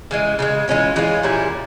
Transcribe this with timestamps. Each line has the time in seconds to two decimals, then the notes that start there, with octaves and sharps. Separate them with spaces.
0.11 C#3 E3 G#3
0.39 C#3 E3 G#3
0.68 E3 G#3 C#4 F4
0.96 E3 G#3 C#4 F4
1.23 A#2 G3 C#4 E4